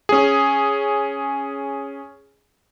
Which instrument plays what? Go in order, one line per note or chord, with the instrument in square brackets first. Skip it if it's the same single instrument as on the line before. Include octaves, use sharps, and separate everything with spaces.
[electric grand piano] C#4 G#4